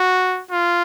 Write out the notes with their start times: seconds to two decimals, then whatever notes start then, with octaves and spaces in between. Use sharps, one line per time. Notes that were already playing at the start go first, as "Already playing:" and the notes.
Already playing: F#4
0.51 F4